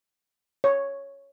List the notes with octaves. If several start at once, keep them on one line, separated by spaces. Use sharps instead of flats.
C#5